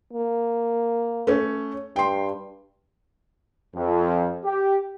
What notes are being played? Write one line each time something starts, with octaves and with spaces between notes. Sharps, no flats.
A#3
A3 C#4
G2 G5 C6
F2
G4